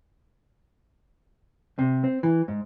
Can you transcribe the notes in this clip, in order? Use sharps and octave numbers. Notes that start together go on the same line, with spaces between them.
C3
C4
E3
G#2